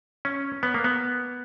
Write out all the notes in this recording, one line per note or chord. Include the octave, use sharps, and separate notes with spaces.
C#4
B3
A#3
B3